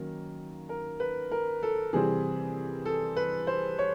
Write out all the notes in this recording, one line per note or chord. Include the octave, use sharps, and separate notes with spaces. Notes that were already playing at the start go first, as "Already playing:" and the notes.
Already playing: D#3 F#3 A#3 C#4 A#4
A#4
B4
A#4
A4
C3 E3 G3 C4 G#4
A4
B4
C5
C#5